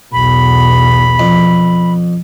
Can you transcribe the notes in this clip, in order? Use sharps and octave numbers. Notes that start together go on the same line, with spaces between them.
B1 E2 B5
F2